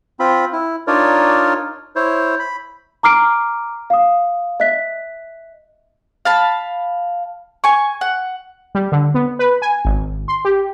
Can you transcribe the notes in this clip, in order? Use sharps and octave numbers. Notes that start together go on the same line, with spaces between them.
C4 F4 B5
E4
D4 D#4 F4 A#4 C#5 D5
E4 C5 C#5
B5
A#5 D6 F6 C7 D7
F5 D#6
D#5 E5 F#6 B6
F5 A5 B5
G#5 C#6
F#5
G3
D3
B3
B4
G#5
G#1
C6
G4